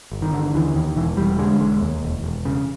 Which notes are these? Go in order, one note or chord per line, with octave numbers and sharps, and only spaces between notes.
G1
D#3
D3
D#2 E3
D#2 D#3
E1 E3
E1 G3
D3 G#3
E1 G#3
D#2
E1
E1
C#3